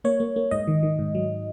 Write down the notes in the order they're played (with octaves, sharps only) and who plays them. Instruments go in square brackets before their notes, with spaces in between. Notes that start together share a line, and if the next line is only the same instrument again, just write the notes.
[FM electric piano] A#3 C#5
A#3
A#3
G#2 D#5
D#3
D#3
G#2
F#3